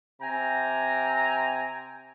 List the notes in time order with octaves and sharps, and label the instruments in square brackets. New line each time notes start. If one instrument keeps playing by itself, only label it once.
[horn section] C3 G5 G#5 A#5